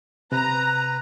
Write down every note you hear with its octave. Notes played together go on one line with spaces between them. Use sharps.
C3 B4 A#5